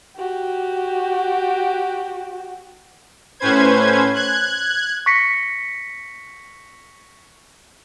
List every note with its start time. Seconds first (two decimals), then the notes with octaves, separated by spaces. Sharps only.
0.17 F#4 G4
3.39 A2 C#4 B4 C5 G#6
4.14 F#6 G#6
5.06 C#6 A#6 B6 C#7